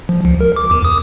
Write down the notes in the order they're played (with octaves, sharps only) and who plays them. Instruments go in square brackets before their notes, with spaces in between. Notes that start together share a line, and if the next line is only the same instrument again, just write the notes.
[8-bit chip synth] F3
C#2
A#4
D6
E2
D#6